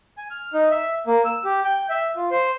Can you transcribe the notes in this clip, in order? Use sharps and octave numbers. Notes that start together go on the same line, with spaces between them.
G#5
F6
D#4
E5
A#3
E6
G4
G5
E5
F4
C5